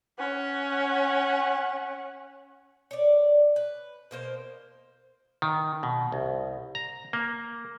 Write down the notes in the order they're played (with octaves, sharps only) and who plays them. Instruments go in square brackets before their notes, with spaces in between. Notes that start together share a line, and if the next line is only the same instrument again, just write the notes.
[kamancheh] C#4 F#5
[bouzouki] C#5 D5
B4
B2 A#3 C5
[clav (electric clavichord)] D#3
B2
C2
A#5
A#3